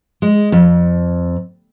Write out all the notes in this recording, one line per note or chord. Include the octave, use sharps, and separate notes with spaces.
G#3
F2